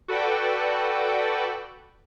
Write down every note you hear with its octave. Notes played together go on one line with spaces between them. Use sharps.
F#4 A4 B4 D5 F#5 G5